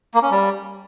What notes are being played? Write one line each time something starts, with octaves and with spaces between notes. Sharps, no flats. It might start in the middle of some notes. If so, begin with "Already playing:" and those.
A#3
C#4
G3